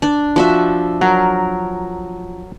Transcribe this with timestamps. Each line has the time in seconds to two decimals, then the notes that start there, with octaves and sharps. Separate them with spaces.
0.02 D4 D5
0.36 F3 F#4 E5
1.01 F#3 A#4